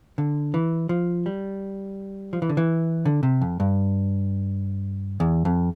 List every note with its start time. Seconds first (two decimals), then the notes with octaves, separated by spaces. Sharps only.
0.18 D3
0.54 E3
0.89 F3
1.26 G3
2.33 F3
2.42 E3
2.49 D3
2.57 E3
3.06 D3
3.23 C3
3.41 F2
3.60 G2
5.20 E2
5.45 F2